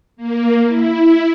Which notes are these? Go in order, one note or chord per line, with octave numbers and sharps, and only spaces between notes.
A#3
E4